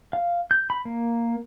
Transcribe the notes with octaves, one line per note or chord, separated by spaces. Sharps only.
F5
G6
B5
A#3